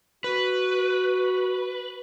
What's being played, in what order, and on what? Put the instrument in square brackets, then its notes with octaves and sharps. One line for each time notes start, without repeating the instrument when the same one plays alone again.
[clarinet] F#4 [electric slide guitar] B4